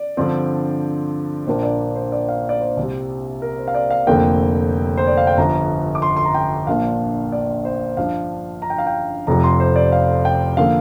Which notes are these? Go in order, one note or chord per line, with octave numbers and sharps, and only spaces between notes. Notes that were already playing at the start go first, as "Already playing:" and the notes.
Already playing: D5
G2 D3 F3 C4
A#1 A#2 A#3 D4 C5
D5
C5
D5
F5
D5
C5
C2 C3 G3
A#4
C5
F5
D5
F5
F1 F2 D3 A#3 G5
C5
D5
F5
G5
G1 G2 F3 A#5
D6
C6
C6
A#5
G5
A#1 A#2 A#3 D4 F5
D5
C5
G2 F3 D4 F5
A#5
G5
F5
G5
F1 F2 C3 F3 A#5
C6
C5
D5
F5
G5
D3 F3 A#3 F5